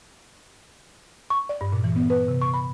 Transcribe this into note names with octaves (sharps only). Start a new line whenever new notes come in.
C#6
D5
G2
A#2
E3
B3
B4
C3
C#6
B5